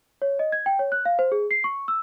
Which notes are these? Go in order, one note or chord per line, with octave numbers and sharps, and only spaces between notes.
C#5
D#5
G#6
G5
C#5
F#6
F5
C5
G#4
C7
C#6
E6